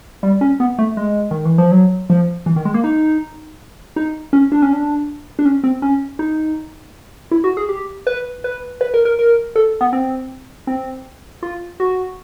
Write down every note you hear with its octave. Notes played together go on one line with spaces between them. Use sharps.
G3
C#4
B3
A3
G#3
D#3
E3
F3
F#3
F3
E3
D#3
G#3
A#3
D#4
D#4
C#4
D4
C#4
D4
D4
C#4
C4
C#4
D#4
E4
F#4
G#4
G4
B4
B4
B4
A#4
A#4
A#4
A4
B3
C4
C4
F4
F#4